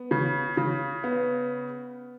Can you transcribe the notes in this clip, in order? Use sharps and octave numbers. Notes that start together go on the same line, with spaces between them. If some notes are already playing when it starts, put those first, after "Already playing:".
Already playing: B3
C#3
C#3
B3